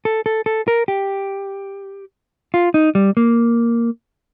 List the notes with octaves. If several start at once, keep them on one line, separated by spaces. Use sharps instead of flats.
A4
A4
A4
A#4
G4
F4
D#4
G3
A#3